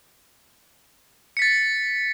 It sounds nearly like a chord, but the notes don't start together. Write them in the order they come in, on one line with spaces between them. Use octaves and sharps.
C#7 B6 A6